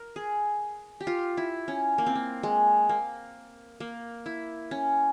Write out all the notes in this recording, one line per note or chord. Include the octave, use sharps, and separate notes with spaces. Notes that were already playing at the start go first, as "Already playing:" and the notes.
Already playing: A#4
G#4
G4
F4
E4
C#4
A#3
C4
A#3
G#3
A#3
A#3
E4
C#4